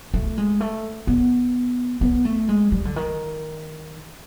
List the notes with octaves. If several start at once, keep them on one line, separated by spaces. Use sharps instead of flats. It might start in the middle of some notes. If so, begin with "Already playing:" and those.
A3
G#3
A3
B3
B3
A3
G#3
G3
D3
D#3